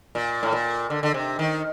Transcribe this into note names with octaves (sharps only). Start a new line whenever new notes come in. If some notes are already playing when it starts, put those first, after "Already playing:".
A#2
A2
A#2
D3
D3
C3
D#3